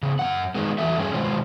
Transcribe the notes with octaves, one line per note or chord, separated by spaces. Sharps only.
C#3 B3
F#2 D#3 F#5
D#3 G#3 B3
E2 E3 F#3 A4 E5
G2 C#4 G#4
B2 D#3 G#3 F4 C5